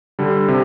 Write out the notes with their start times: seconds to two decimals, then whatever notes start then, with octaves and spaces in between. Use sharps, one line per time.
0.19 D3 G3
0.48 C3